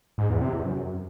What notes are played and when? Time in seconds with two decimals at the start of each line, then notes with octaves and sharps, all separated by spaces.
0.18 G#2
0.30 E2
0.41 C3
0.53 E2
0.64 F#2